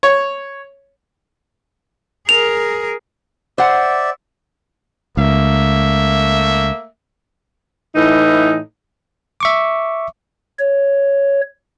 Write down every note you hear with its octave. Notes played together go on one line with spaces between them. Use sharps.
C#5
G#4 A#4 F7
C5 D5 E5 F#5
C#2 A3 A#3 E5
A2 E3 D#4
E5 C#6 D6
C#5